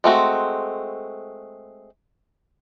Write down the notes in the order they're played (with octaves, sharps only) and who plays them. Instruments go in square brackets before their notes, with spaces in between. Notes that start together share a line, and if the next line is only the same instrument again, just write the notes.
[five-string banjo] G#3 A3 C4 F#4